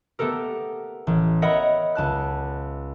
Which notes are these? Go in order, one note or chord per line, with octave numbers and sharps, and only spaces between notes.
A3 B3 G4 A4 A#4
A1
A#4 C#5 D#5 E5 F#5 B5
C#2 A5 F#6